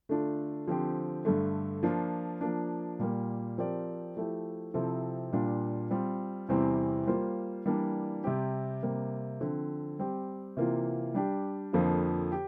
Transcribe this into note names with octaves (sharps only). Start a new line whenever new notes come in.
D3 A3 D4 F4
D3 F3 C4 G4
G2 D3 A3
F3 A#3 D4 F4
F3 A#3 D4
A#2 G3 A#3
F3 C4 G4 A#4 D5
F3 A3 E4 G4
C3 F3 C4 E4 A4
A#2 G3 D4 F4
G3 C4 F4
E2 C3 E3 G3 C4
G3 A#3 F4 C5
E3 G3 A#3 D4
C3 G3 C4 G4
C3 G3 A#3
D3 F3 C4
G3 C4 G4
C3 E3 A#3 F4
G3 D4 G4
F2 D3 F3 A#3 F4
G4